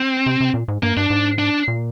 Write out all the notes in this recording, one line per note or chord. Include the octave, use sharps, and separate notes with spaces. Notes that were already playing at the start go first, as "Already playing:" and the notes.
Already playing: C4
C3
C3
A#2
G#2
G2 A#3
G2 D4
G#2
D4
A#2